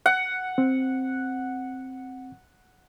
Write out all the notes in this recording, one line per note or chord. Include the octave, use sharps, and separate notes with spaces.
F#5
C4